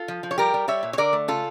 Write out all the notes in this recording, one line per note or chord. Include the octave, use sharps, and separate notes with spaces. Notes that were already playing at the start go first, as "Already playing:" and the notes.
Already playing: F4 A4
F3
F3
C#5
G3 G4 A#4
G3
G3 C#5 E5
A#2
C#5
D3 A#4 D5
A3
C#3 F4 A4